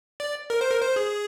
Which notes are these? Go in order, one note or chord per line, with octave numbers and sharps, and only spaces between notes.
D5
A#4
C5
A#4
C5
G#4